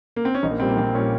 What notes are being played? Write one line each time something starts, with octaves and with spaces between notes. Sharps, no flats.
A#3
C4
C#4
A#1 D#4
A#3
A#2 G3 C4
A#3
A#1 C4
A#2 G3 C#4